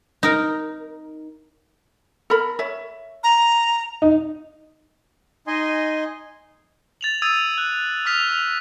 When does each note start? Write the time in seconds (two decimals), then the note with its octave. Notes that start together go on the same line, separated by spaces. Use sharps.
0.23 D#4 A#4
2.30 A4 A#4 B5
2.59 C#5 E5
3.24 A#5
4.02 D#4
5.47 D#4 D#5 G#5 C6
7.01 A6 F7 F#7
7.22 D#6 E6 G#6 A6 D#7
7.58 F#6
8.05 D#6 F6 B6 F7